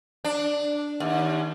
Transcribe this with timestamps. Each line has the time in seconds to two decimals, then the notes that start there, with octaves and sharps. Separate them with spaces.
0.25 D4
1.00 D#2